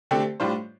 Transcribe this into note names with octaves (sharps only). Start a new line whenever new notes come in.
D3 A3 C4 G4
A2 G3 D4 F4 C5